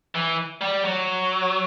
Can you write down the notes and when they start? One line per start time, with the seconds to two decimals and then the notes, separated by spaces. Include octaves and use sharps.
0.15 E3
0.61 G3
0.85 F#3